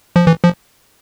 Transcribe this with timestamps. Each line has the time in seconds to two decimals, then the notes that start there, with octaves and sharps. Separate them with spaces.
0.16 F3
0.27 E3
0.44 F3